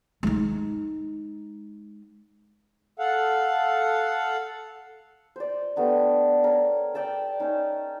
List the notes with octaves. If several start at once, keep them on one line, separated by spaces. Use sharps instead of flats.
G#3 D#4
A4 F5 F#5
C5 D5
G3 A3 B3 D4
A#4 C#5
D5 G5 A5 E6
C#4 D#4